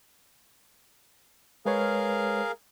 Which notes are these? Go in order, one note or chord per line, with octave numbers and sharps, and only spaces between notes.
G#3 G#4 A#4 B4 C#5 F5